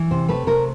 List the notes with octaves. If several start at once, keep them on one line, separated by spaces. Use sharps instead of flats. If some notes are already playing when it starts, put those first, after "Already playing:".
Already playing: E3
C3 C5
A3 B4
C3 A#4